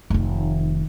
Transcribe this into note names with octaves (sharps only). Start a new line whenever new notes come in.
F1 D#3